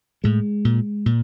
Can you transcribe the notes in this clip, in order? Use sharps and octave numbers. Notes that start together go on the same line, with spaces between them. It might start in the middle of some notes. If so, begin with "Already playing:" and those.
A2 G#3
A#2
A#2